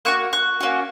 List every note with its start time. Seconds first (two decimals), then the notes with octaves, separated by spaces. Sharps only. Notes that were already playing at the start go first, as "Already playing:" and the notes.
0.05 A#3 F#4 C#6 F#6
0.33 C#6 F#6
0.61 A#3 C#4 F#4